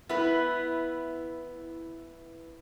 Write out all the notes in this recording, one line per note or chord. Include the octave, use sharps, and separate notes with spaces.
B3 E4 B4